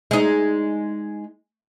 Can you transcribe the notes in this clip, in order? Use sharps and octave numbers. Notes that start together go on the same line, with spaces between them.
G#3 D#4